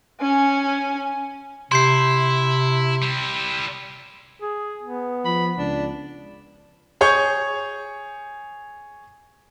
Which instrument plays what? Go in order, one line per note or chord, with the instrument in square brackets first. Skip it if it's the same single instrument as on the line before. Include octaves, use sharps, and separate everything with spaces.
[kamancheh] C#4 G#5
[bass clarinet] C3 [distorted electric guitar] E4 [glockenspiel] C6 G6 C7
[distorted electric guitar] G3 E4
[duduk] G#4
B3
[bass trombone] F3 [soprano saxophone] B5
[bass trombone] C#2 [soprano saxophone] D4
[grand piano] G#4 C#5 C#6 G6